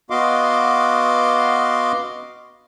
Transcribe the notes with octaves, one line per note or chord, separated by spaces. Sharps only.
B3 F#4 D#5 F5 C6 D6